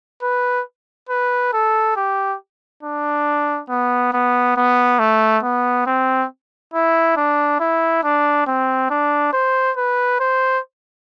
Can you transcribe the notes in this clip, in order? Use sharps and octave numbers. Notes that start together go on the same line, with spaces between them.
B4
B4
A4
G4
D4
B3
B3
B3
A3
B3
C4
E4
D4
E4
D4
C4
D4
C5
B4
C5